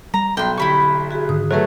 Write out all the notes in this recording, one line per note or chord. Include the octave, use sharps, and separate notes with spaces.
G3 A#5
B1 G5 C6
D3 E4 G4 B5 C#6
F#4 G#4
G#2 D3 D#3 D#6
F#3 A3 F#4 G#4 B4